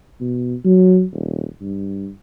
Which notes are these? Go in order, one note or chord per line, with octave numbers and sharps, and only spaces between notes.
B2
F#3
D#1
G2